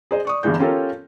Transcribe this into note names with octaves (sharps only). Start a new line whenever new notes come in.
G#4 C5 D#5
D5 C#6 D#6
G1 G2 D3 E3 G#3 G6
C#4 F4 G4 A4 A#4 C#5